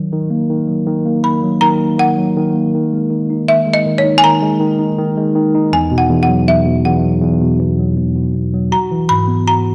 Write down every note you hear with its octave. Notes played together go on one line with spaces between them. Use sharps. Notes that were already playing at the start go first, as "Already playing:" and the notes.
Already playing: D#3 F#3
D#3
A#3
D#3
F#3
D#3
A#3
D#3 B5
F#3
D#3 A#5
A#3
D#3 F#5
F#3
D#3
A#3
D#3
G#3
D#3
D#4
D#3 E5
G#3
D#5
D#3
C#5
D#4
G#5
D#3 A#5
G#3
D#3
D#4
D#3
G#3
D#3
D#4
E2 G#5
B2
F#5
E2
F#5
F#3
E2 E5
B2
E2 F#5
F#3
E2
B2
E2
F#3
E2
B2
E2
F#3
F#4 A#5
E3
G#2 B5
B3
F#4 A#5